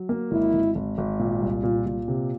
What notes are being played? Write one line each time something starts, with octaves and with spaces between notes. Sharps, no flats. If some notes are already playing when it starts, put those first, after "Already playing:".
Already playing: F#3
A#3
G#1 E4
G#1
G#1
G#1
A#2
C2
A#2 F4
A#2
C3